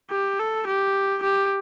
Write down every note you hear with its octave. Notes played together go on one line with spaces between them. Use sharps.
G4
A4
G4
G4